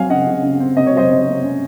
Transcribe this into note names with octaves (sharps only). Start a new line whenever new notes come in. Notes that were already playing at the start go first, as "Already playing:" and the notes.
Already playing: F#3 C4 F5 G#5
C#3 D#5 F#5
C#3
C#3
C4
C3 D#5
C#5
F#3 C5 D#5
C3
C3
C#4